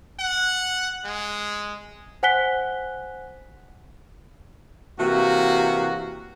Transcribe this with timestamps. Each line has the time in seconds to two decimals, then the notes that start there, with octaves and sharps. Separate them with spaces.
0.19 F#5
1.04 G#3
2.23 C5 F#5 G#5 F#6 B6 G7
4.98 C3 E3 A#3 F#4